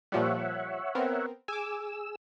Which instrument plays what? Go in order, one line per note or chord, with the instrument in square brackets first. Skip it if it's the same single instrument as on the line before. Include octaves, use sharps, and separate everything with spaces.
[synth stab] A#2 F3 G3 [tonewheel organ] C#5 E5 F#5
[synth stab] B3 C4 A#4
[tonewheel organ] G#4 E6 [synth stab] G#5 D6